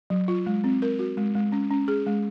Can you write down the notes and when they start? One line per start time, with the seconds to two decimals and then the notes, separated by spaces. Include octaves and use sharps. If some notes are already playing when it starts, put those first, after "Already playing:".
0.10 F#3
0.28 F4
0.46 G#3
0.64 C4
0.82 A#4
0.99 F#4
1.17 G#3
1.35 G#3
1.52 C#4
1.71 C#4
1.88 G#4
2.06 G#3